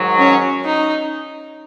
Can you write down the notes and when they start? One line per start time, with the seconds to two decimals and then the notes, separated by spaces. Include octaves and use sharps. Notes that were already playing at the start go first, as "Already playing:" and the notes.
Already playing: G#2 D#3 F#3
0.19 C#4
0.64 D#4